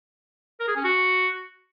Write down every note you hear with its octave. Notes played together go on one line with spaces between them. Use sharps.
A#4
G#4
C#4
F#4